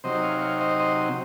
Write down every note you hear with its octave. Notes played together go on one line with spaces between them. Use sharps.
C3 F#3 C4 D#4 C5 D#5
C#5 F5
C#5 F5
C5 D#5
C5 D#5